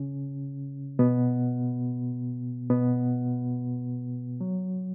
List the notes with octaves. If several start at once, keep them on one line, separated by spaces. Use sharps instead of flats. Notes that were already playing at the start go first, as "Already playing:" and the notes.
Already playing: C#3 C#4
B2 B3
B2 B3
F#3